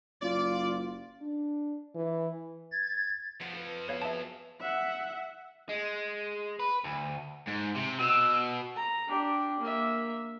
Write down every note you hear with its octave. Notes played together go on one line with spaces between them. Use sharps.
F#1 F4 D5
D4
E3
G#6 A6
F2 F3 C#5 F5 F#5
A4 B4
B3 F#4 B4 C#5 F5
G#4 D#5 E5 A5
E5 F#5
G#3
B4
D2
G#2
C3
B2 E6
A#5
D4 G4
A#3 E5